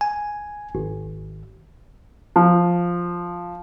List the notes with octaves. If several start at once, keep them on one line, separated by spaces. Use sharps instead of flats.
G#5
G#1
F3